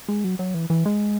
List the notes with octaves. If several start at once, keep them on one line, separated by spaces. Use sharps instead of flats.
G#3
F#3
F#3
E3
E3
G#3